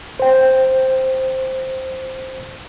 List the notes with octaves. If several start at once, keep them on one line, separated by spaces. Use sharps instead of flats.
C5 G5